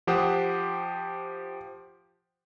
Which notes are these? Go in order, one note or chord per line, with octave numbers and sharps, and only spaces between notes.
F3 G4 C5 F#5 D#6